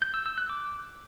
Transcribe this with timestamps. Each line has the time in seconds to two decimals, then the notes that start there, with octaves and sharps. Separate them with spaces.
0.02 G6
0.14 E6
0.26 E6
0.38 F#6
0.50 D6